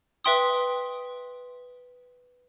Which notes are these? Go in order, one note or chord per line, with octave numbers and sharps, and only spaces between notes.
B4 E5 G5 C6 D#6